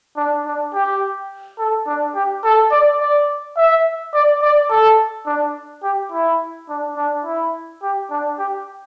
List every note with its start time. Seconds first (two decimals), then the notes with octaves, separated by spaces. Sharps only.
0.17 D4
0.46 D4
0.74 G4
1.59 A4
1.87 D4
2.15 G4
2.44 A4
2.71 D5
3.00 D5
3.57 E5
4.14 D5
4.42 D5
4.71 A4
5.26 D4
5.83 G4
6.12 E4
6.69 D4
6.97 D4
7.25 E4
7.82 G4
8.11 D4
8.38 G4